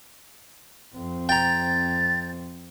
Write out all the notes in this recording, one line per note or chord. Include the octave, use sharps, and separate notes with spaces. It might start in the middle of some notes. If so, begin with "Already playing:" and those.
F2 C4
G5 A#5 A6